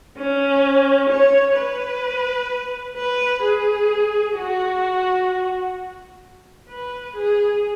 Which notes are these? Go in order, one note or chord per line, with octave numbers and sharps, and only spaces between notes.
C#4
C#5
B4
B4
G#4
F#4
B4
G#4